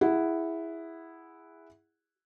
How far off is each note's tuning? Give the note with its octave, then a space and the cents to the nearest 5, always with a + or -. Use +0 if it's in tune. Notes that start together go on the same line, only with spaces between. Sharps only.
E4 +0 G#4 -15 F#5 +0